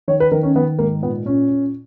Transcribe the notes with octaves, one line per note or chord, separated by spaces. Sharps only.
D#3 C#5
B4
D#3 A#4
C#4
D#3 B3
G#2 A#3
A#2 B3
A#2 C#4
A#2